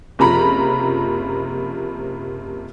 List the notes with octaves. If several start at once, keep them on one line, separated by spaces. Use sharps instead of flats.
F#1 C3 F3 A#5 B5